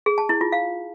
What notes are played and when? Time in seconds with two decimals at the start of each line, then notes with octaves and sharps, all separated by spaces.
0.06 G#4
0.18 A5
0.29 E4
0.41 F4
0.52 F5